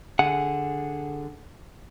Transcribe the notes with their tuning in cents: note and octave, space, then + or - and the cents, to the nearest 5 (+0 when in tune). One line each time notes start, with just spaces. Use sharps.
D3 +0 G#4 +0 F#5 +0